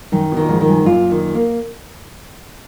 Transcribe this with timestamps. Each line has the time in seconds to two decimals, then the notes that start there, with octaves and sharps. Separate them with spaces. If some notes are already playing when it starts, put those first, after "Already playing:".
0.12 F#2 D#3
0.32 B2
0.37 A#2 D#3
0.49 F2 G#2
0.60 F2 D#3
0.69 F#2
0.77 G#2
0.85 F#2 A#2 F4
1.11 D#3
1.34 A#3